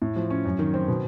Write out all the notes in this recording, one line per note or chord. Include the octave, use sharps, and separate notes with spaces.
A2
F3
C#4
F#2
D#3
C4
B2